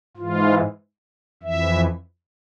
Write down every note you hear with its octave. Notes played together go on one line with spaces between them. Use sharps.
G#2 E3 F4
F2 E3 E5